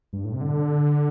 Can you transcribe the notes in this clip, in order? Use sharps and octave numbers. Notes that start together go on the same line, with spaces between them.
G2
A2
C3
D3